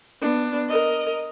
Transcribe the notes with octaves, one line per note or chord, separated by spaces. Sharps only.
B3 D4
A#4 D#5